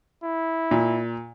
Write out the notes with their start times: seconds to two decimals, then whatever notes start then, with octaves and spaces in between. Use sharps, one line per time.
0.23 E4
0.71 A#2